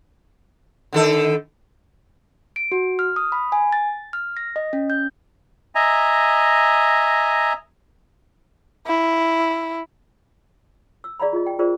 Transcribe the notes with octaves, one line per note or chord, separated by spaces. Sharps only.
D3 D#3 A4
D7
F#4
F6
D#6
B5
G#5
A6
F6
A#6
D#5
C#4
G6
D#5 E5 G#5 A#5
E4
E6
G#4 D5 F5 A#5 B5
F4 G#4 D#5
G5
F4 G#4 A#4 C5 D5